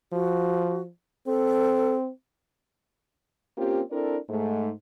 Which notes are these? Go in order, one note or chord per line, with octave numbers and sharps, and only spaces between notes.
F3 F#4
C4 A4
A#3 C4 C#4 F4 G4
C4 D4 E4 A4 A#4 D5
G#2 A3